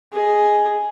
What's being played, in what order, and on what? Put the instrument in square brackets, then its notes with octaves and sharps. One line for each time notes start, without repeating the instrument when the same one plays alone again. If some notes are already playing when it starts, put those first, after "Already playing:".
[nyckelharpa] G#4 D#5